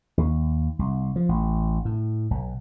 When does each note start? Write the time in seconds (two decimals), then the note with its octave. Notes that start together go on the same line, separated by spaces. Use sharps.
0.18 D#2
0.79 C2
1.16 F3
1.29 A1
1.85 A2
2.31 B1